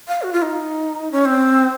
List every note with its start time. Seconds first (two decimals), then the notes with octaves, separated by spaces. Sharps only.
0.08 F5
0.22 F#4
0.33 F4
0.42 D#4
1.12 C#4
1.25 C4